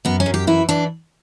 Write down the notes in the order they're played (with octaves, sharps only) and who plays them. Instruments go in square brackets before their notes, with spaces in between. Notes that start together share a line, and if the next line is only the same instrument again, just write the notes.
[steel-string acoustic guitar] F#2 B3
C#4
F#2
G4
E3 E4
E3 D4